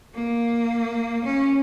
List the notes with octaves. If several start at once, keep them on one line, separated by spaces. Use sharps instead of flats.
A#3
C#4